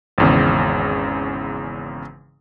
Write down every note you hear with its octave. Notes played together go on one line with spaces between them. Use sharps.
G#1 E2 C#3